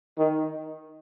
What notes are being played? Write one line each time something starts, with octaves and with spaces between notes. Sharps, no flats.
D#3